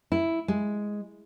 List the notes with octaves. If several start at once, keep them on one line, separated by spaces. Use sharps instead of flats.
E4
G#3